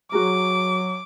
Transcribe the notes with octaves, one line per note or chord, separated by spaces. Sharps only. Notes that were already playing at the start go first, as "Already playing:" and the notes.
F#3 F#4 G#4 A#4 D6